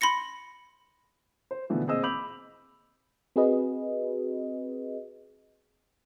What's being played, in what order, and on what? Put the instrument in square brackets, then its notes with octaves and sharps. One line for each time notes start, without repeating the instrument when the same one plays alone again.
[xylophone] B5 C6 A#6 C#7
[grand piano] C5
B2 D3 E3 F3 A3
A#2 C4 G#4 D#5 E6
B5 D6 E6 G6 F7 F#7
[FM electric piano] C4 F#4 G#4 B4 D#5